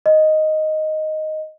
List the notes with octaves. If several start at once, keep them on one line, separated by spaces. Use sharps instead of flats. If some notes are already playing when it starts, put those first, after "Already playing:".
D#5